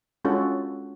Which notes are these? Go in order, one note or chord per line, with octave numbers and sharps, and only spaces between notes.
G#3 C#4 D4 F4 F#4 A4